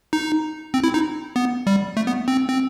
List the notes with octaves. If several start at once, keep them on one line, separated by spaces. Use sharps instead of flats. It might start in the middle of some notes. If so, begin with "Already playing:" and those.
D#4
C4
E4
D#4
B3
G3
A3
B3
C4
C4